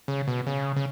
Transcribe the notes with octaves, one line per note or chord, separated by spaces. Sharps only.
C#3
B2
C#3
C#3